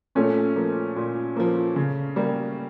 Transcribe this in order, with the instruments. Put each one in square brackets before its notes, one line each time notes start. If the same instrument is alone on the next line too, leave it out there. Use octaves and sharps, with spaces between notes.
[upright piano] A#2 [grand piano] A3 C#4
[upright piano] F3 A#3
A#2
F3 A#3
C#3
G3 A#3